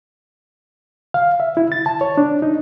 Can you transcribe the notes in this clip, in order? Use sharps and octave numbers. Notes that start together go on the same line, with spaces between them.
F5
E5
E4
A6
A5
C#5
D4
D#4